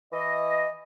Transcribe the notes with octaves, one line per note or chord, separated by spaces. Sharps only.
E3 D#5